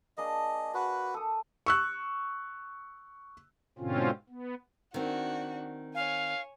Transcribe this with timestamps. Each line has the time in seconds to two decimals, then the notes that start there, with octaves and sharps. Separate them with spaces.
0.17 A#3 D4 G#4 D#5
0.74 F#4 B4
1.14 A4 D#6
1.66 C#6 E6 F#6
3.78 G#2 B2 D3 C4 C#4 F4
4.29 B3
4.94 D#3 C4 D4 F#4
5.95 C#5 F5 G#5